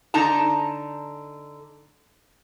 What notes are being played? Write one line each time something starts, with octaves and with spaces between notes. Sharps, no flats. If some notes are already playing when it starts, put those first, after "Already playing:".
D3 D#4 A5 A#5